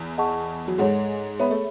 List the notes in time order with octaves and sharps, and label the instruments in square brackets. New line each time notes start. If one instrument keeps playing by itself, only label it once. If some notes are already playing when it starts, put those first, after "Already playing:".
Already playing: [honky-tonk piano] E2
[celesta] G#4 D#5 F#5 A5 C#6
[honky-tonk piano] F#3
[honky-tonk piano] G#2 G#3 [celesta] A4 C#5 F#5
[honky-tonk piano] B3 [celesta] G#4 C#5 E5 B5
[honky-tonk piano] A3